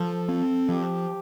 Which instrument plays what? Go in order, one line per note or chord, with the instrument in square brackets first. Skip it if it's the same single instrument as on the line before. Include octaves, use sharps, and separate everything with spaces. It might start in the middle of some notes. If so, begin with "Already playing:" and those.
Already playing: [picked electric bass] F3 [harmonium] A4
[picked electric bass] C4
[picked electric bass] F3 [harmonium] G4